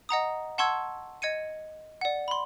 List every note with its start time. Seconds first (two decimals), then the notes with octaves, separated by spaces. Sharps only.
0.09 D#5 F#5 A#5 D#6
0.58 F#5 A5 C6 C#6 E6 G#6
1.22 D#5 G#6 C#7 D#7
2.01 D5 F#5
2.28 B5 C6